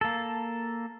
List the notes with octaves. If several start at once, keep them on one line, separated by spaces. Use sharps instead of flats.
A#3 A4